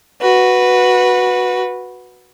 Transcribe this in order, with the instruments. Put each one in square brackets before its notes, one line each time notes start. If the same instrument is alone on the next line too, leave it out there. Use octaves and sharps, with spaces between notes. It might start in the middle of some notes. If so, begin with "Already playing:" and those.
[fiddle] F#4 B4